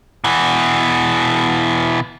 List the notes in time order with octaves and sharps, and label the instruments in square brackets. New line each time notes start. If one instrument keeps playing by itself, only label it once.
[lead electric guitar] B2 E3